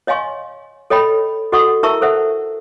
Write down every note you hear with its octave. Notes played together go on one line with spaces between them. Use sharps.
C#5 D#5 F5 G#5 C6 C#6
A4 C#5 D#5 G5 B5
F#4 A4 D#5 F#5 C#6 D#6
E4 A#4 E5 A5 C#6 E6
A4 C5 E5 F#5